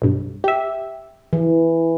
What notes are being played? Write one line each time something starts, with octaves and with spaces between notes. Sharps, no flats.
B1 G2
G4 E5
E3